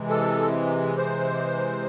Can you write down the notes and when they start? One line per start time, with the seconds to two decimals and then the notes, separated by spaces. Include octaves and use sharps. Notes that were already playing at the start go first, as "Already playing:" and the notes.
Already playing: C3 E3 G#3
0.10 A4
0.97 C5